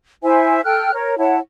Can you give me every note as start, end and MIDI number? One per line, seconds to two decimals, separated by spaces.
0.22 0.61 64
0.22 0.61 72
0.22 0.61 76
0.22 0.61 80
0.64 0.93 69
0.64 0.93 79
0.64 0.93 89
0.64 0.93 90
0.93 1.17 70
0.93 1.17 73
1.18 1.38 64
1.18 1.38 73
1.18 1.38 78
1.18 1.38 81